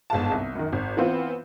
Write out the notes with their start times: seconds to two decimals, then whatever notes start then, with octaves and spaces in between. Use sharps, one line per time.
0.10 G1 G#2 F5 A5
0.31 C2
0.55 F#2 D#3
0.72 G#1
0.97 E3 B3 C4 F4